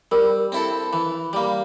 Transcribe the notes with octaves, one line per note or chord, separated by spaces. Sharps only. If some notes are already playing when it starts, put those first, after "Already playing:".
G3 A#4
C4 E4 A4
E3
G3 A#3